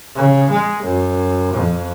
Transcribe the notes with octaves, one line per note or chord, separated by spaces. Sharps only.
C#3
G#3
F#2
F2